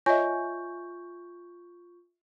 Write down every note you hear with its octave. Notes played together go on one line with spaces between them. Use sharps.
F4 C#5 D#5 E5 G#5 C#6 G6